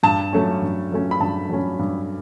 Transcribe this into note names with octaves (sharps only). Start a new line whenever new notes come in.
G2 A5
F#3 A3 C#4
G2
F#3 A3 C#4
B5
G2 A5
F#3 A3 C#4
G2